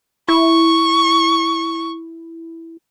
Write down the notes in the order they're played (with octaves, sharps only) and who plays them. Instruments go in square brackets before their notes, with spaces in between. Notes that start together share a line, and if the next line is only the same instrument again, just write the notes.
[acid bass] E4 [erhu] C#6